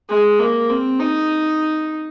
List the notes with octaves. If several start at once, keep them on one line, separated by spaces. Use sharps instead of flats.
G#3
A#3
C4
D#4